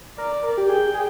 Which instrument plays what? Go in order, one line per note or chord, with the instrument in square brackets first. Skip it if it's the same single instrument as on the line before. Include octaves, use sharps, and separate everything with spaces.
[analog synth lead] A#4 [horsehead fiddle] D5
[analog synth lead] A#4
G4
[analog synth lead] G#4 [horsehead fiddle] G5
[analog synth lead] G#4